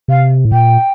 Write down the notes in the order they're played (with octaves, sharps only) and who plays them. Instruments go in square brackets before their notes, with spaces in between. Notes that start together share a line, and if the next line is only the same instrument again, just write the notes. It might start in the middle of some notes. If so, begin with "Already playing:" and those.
[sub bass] C3 [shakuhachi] F5
[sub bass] A2
[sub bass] A#2 [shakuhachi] G5